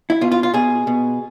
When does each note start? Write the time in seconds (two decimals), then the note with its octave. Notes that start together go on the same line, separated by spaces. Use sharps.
0.10 E4
0.21 B2 F4
0.32 F4
0.43 F4
0.54 B2 G#4
0.87 B2